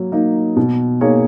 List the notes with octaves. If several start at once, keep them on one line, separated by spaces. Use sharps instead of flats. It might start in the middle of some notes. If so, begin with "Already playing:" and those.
Already playing: F#3 A#3
A#3 D#4
B2
A#3 D#4 G#4 C#5